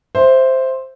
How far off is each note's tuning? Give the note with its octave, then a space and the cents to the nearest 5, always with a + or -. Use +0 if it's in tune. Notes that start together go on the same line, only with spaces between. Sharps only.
C5 +0 E5 +0